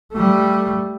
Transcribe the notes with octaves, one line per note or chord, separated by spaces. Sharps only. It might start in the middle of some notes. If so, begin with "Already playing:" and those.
G3 A3